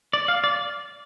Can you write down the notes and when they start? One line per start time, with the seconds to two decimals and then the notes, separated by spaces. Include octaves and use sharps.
0.13 D5
0.28 F5
0.44 D5